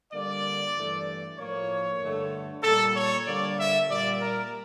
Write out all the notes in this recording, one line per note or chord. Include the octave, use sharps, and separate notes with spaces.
D3 G3 A#3 D5
G2 E3 A3
A2 F3 A#3 C#5
G2 D3 A3
A#2 G3 A#3 A4
C#5
D3 G3 A#3 D5
E5
A#2 G3 A#3 D5
A#4